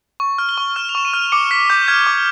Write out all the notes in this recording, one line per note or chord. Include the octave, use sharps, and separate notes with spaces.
C#6
F6
G7
C#6
F6 E7
F7
C#6 E7
D#7
F6
D6 C#7
F6 B6
D6 G6
F6 G#6
D6